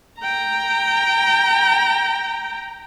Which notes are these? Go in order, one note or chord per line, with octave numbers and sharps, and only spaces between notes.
G5 A#5